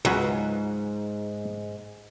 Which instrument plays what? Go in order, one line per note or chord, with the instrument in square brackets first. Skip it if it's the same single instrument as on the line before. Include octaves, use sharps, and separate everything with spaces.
[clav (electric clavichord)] C#2 F#3 B4 [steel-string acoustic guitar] G#2